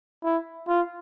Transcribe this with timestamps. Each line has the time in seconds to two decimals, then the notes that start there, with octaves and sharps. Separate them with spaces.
0.24 E4
0.68 F4